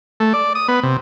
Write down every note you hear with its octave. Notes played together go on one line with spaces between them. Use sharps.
A3
D5
D#6
B3
C3